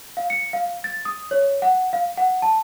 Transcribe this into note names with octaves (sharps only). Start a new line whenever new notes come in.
F5
C#7
F5
A6
D#6
C#5
F#5
F5
F#5
A5